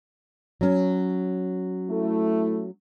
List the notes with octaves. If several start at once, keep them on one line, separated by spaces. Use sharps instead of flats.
F#3 C#4
A3 E4